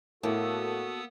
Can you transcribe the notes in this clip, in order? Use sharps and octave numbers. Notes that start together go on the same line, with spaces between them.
A2 A#3 B3 F#4 A4 D#6 E6